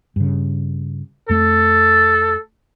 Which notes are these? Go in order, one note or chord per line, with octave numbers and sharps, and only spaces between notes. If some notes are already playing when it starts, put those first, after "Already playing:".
G2 C#3
F2 A3 A4